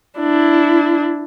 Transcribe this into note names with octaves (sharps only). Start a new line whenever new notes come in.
D4 E4